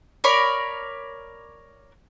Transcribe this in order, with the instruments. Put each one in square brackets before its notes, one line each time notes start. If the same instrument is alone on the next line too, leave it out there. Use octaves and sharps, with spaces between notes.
[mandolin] A#4 C#5 D5 B5